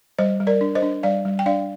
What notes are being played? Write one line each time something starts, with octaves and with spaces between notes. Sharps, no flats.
G3 C5 D#5
G3
A#4 D5
D4
C5 D#5
D4
G3 D5 F5
G3
G5
D4 D5 F5